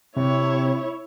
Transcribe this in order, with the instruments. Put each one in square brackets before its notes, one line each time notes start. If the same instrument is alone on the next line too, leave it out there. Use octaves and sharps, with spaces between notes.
[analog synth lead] C3 [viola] E4 C#5